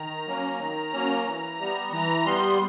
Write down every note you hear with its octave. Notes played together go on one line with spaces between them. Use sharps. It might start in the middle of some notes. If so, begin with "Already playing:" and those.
Already playing: D#3 A#5
F#3 A#3 C#4
D#3
F#3 A#3 C#4
E3
G3 B3
E3 A#5
G3 B3 C6